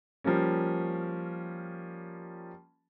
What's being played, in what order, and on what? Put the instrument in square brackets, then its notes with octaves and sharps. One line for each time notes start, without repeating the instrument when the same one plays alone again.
[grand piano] F3 G3 A#3 C#4